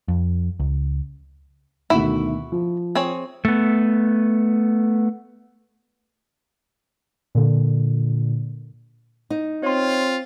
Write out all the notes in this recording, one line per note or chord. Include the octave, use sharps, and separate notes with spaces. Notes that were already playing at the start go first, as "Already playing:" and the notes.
F2
C#2
D2 B2 D#3 E4 F#4 E5
F3
C4 G#4 C#5
A3 B3
A#2 D3
D#4
C4 F4 C#5 C6